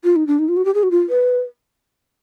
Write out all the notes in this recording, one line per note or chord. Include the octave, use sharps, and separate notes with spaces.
F4
D#4
D4
D#4
F4
F#4
G4
G#4
F#4
F4
B4